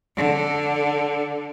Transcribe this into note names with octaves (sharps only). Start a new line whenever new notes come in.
D3